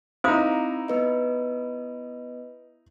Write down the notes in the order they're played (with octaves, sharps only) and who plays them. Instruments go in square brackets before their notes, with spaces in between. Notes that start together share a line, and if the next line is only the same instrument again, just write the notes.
[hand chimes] C4 A#5 [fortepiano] D#4 E4 [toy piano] C5 F5 D#6
[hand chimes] B3 B4 D#5